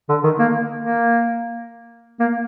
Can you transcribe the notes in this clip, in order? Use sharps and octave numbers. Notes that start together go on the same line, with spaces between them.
D3
D#3
A#3
A#3
A#3